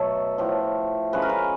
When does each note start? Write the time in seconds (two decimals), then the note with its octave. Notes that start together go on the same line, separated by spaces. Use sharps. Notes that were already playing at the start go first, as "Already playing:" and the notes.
Already playing: B2 F#3 A3 A4
0.38 A2 F3 A3
1.13 C#3 F3 G#3 B4
1.22 A#4
1.29 B4